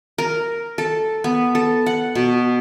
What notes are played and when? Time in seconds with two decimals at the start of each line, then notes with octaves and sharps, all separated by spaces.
0.18 A#4
0.78 A4
1.24 B3
1.55 A4
1.86 F#5
2.15 B2